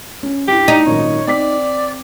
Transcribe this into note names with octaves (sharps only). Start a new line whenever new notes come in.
C#4
G2 E4 G4
D#4
G#1 F#2 A#2 C#5
C4 D5 D6 B6